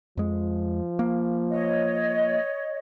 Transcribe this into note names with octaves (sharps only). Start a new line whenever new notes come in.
F2 F3 G#3
A#3
C#5 D#5